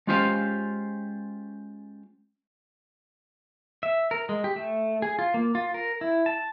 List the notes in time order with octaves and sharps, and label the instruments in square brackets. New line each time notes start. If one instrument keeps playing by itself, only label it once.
[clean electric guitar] G#3 C#4 F4 G4 C5 F5
[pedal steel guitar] E5
A#4
G#3
G4
A3
G#4
F4
A#3
F4
A#4
E4
A5